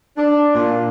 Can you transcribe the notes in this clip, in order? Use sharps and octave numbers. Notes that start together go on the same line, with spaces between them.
D4
A#2